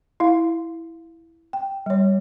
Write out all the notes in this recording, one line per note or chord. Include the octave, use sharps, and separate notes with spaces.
E4 F5
G5
G3 C#5